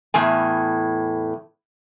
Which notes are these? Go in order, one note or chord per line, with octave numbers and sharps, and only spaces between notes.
E2 A2 G#5